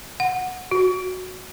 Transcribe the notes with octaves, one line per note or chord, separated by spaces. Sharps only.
F#5
F#4